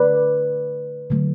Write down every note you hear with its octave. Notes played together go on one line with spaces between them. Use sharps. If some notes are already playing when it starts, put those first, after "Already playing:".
Already playing: D3 A3 B4 D5
D3 F#3 A3